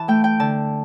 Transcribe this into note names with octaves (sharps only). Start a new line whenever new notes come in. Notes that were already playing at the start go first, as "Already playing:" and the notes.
Already playing: E3 A5
A3 G5
G5
D3 A5